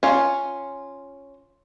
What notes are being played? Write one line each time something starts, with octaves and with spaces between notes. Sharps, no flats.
C#4 F4